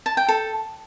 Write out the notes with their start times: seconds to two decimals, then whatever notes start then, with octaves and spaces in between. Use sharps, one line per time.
0.06 A5
0.17 G5
0.28 A4